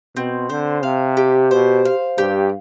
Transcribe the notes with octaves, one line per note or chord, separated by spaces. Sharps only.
B2 C4
D3 C5
C3 F5
G4
B2 C5
F5
G2 G4